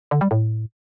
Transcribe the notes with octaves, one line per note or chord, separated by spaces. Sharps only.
D3
G3
A2